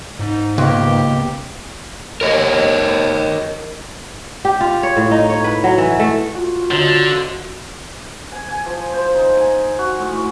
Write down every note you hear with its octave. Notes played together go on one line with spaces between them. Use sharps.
G#2 D#4
C#2 D#3 A#3 B3 G4
A#4 C#5 D#5
G4
F4
C#5
A2
D#4
C#5
B4
F#3
E3
A3
F4 F#4
D3 F#3 C5 D#5
G#5
G#5
F3
C5
D#4
G#5
F#4
A2
C#6